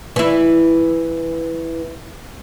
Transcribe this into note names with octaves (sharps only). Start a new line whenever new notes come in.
E3 E4